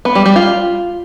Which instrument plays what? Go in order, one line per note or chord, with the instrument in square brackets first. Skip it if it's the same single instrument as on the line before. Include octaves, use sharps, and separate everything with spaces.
[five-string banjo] B3
G3
G3
F4